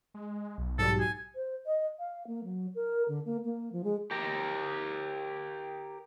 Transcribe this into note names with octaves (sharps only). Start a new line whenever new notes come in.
G#3
B1
G#2 F#3 G3 A4
G#5
C5
D#5
F5
A#3
F#3
A#4
D3
A#3
A#3
F3
G#3
G4 A#4